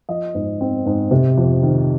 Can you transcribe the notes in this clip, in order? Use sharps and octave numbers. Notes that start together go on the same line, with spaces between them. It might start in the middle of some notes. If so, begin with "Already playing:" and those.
F3 D#5
G#2
C4
G#2
C3
F2
D#3